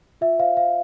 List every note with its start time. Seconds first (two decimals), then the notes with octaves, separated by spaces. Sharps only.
0.21 F4 E5
0.39 C5 F5
0.57 C5 F5